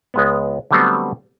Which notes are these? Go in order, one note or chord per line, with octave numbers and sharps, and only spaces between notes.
C#2 G#3 B3
D3 F#3 G3 A3 B3 C4